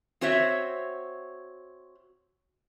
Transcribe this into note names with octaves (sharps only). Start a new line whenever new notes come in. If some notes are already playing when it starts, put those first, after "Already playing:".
C4 F#4 C5 C#5 E5